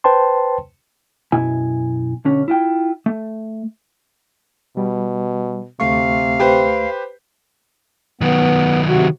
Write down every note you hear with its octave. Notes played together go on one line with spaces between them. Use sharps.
B4 C5 G5 A5 C6
F#2 B2 E4 G#5
B1 D3 C#4
E4 F4 G5
A3
B2 G3
D2 C3 A3 F5 C#6
G4 B4 C5
D#3 F#3 B3
C3 F#4